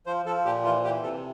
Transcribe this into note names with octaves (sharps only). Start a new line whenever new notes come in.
F3 C5
F3 A4
A#2 G4
E3 F4
E3 G4
C3 A4